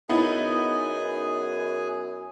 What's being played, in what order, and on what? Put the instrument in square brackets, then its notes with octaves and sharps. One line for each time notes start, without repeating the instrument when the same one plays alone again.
[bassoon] F#2 [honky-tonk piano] B3 D#4 E4 [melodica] G#4 G#5